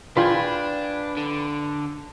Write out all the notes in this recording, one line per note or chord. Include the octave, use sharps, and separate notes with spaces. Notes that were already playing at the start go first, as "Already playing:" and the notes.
A#1 D4 F4 B4 G5 G#5 C6
D3